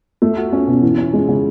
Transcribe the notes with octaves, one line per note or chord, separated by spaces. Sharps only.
A3
F#4
C#4
B2
E3
C#4
G#3
C#3